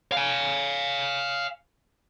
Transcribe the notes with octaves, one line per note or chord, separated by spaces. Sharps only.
F5 G#5